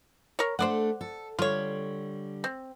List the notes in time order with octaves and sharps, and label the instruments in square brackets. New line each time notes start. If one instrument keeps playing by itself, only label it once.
[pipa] A#4 C#5
[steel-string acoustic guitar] A3 D4 A4 [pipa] C5 D5 F#5
[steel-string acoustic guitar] A4
[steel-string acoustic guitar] D3 G3 [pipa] F4 C#5
[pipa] C4